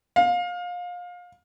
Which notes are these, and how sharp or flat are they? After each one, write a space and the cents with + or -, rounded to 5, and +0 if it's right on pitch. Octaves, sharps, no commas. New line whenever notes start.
F5 +25